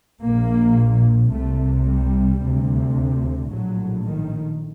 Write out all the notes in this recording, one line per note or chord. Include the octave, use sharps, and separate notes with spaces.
A#1 A#2 A#3
C2 C3 A3
G3
D2 C3
A#1 A2 F#3
D#3